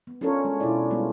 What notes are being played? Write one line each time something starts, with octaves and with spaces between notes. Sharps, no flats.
B3
C#4 D4 F4 A4 A#4 C#5
G#3
B2 D4 E4 F4 D5
G3 G#3 B3 F4